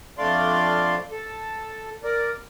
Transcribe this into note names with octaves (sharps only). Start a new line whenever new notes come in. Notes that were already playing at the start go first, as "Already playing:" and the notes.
F2 A3 D4 D5 F5 C6
A4
A#4 D5